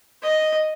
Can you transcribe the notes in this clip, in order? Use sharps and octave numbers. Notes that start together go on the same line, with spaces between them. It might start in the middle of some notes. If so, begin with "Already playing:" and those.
D#5